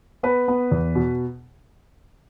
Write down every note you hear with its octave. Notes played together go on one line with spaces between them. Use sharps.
B3 B4
B3
E2
B2